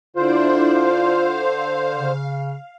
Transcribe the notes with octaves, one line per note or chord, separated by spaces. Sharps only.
D3 D4 E4 F4 C5 D5
F5
C#3